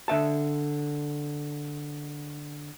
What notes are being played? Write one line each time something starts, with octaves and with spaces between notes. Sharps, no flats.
D3 E5 A5